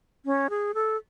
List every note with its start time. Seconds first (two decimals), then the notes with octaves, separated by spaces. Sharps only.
0.26 C#4
0.50 G#4
0.75 A4